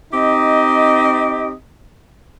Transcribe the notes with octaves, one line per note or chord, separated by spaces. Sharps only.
C4 D#4 G4 D#5